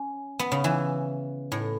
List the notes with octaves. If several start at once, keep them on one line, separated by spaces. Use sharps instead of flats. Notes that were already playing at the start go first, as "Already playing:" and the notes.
Already playing: C#4
B3
C#3
E3
A2